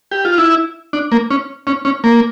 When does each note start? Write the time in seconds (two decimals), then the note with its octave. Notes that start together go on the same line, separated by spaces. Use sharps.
0.11 G4
0.25 F4
0.38 E4
0.93 D4
1.12 A#3
1.30 C#4
1.67 C#4
1.85 C#4
2.04 A#3